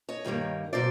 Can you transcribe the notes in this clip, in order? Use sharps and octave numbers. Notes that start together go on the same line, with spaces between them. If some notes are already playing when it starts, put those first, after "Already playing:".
C#5 D#5
G2 D#3 G3 A#3
B2 F#3 C5 D5